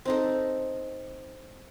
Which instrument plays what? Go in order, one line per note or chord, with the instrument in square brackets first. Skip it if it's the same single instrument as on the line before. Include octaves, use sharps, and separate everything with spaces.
[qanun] C4 D#4 A4